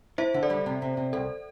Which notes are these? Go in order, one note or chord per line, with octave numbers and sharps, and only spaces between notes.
E4 C5 E5
D3
A4 D5
G3
C3
C3
C3
C2 A4